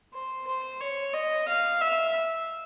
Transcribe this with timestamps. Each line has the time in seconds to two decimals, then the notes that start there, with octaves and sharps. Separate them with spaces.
0.14 C5
0.47 C5
0.81 C#5
1.14 D#5
1.48 F5
1.81 E5